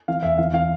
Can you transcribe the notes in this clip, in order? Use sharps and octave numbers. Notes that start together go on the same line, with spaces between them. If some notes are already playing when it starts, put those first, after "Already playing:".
E3 F5
E2 E5
E3 F5
E3 F5